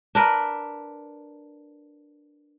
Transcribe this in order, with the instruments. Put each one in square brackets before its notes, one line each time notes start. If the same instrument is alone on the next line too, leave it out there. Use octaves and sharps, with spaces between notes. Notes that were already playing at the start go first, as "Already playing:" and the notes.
[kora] D4 A#4 B4